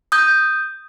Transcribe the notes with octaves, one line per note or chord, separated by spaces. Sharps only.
D#6 G6